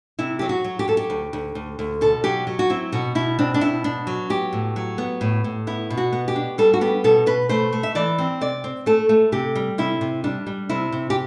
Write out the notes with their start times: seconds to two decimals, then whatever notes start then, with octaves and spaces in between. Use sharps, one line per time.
0.19 C3 E4
0.39 F#3 G4
0.49 F#4
0.64 F#3
0.79 G4
0.88 F#3 A4
0.97 G4
1.10 D2
1.33 D2
1.55 D2
1.79 D2
2.01 B2 A4
2.24 F#3 G4
2.47 F#3
2.59 F#4
2.70 C4 E4
2.92 B2 F#4
3.15 B2 E4
3.39 C4 D4
3.54 D4
3.61 B2 E4
3.84 B3 D4
4.07 F#3
4.30 B3 G4
4.53 A2
4.76 F#3
4.98 B3
5.21 A2
5.44 A2
5.67 B3 E4
5.90 B2
5.97 F#4
6.13 B3
6.28 G4
6.36 D4
6.58 G3 A4
6.74 F#4
6.81 B3 G4
7.04 B2 A4
7.26 B2 B4
7.49 A3 C5
7.73 A3
7.83 E5
7.95 E3 D5
8.18 C4
8.41 C3 D5
8.64 C4
8.86 A3 A4
9.09 A3
9.32 C3 G4
9.55 G3
9.78 C3 E4
10.01 C3
10.24 G3 D4
10.47 G3
10.69 C3 E4
10.92 C3
11.10 G4